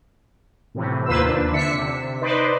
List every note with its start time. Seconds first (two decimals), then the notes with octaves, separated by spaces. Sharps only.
0.75 A2 C3 E3
1.06 D#2 A#3 F4 B4 C5 E6
1.27 D4
1.52 D3 D4 E5 B6 C#7
1.73 C3
2.21 D#4 B4 C5 D5 D#5